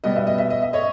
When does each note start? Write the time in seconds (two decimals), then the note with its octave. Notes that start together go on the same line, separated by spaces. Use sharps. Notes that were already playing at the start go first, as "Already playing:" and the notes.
0.04 B2 G3 B3 D#5
0.16 E5
0.27 D#5
0.38 E5
0.50 D#5
0.62 E5
0.73 C#5 D#5